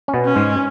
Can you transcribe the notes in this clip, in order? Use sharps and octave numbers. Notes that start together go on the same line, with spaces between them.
C#4
B2 B3
C#4
G#2 G#3